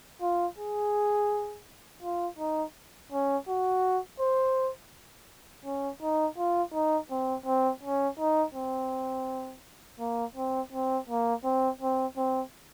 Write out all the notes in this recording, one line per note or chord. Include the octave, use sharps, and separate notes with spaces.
F4
G#4
F4
D#4
C#4
F#4
C5
C#4
D#4
F4
D#4
C4
C4
C#4
D#4
C4
A#3
C4
C4
A#3
C4
C4
C4